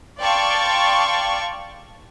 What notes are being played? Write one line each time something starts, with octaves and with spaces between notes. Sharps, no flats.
D5 F5 G5 A5 C6 C#6